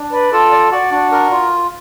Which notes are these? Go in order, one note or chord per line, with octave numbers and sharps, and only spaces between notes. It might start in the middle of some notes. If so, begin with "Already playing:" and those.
Already playing: D4
B4 D5
F4 A4
D5
F#4 D5
D4 F#4
A#4
F4